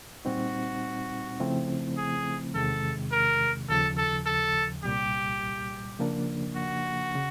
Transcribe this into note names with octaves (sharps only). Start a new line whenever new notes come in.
A#2 G3 C4 D#4 F#4
C#3 F3 A3 C4 E4
G#4
E2 C3 D#3 G#3 A4
A#4
D#2 C#3 F3 A4
A4
A4
C2 A#2 G3 G4
C#3 F3 A#3 D4
F#4
C#3